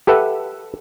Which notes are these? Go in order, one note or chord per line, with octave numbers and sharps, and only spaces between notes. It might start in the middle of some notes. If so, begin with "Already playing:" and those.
G4 A4 B4 E5 F#5